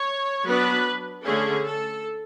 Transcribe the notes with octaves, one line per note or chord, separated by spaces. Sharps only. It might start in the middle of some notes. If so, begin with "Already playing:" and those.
Already playing: C#5
F#3 B3 D4 B4
D3 A3 C#4 G#4
A4